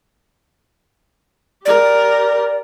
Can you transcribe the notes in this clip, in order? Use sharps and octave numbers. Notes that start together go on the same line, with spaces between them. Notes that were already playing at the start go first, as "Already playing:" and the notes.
G4 A#4 D5